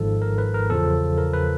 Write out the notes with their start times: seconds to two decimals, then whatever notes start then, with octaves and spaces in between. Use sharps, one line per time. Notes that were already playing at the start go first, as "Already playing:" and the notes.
Already playing: G#1 G#2 F3 A4
0.22 A#4
0.38 B4
0.54 A#4
0.69 E2 C#3 F3 A4
1.18 A#4
1.33 B4